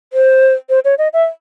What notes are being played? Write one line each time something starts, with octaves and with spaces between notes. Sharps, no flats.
C5
C5
C#5
D#5
E5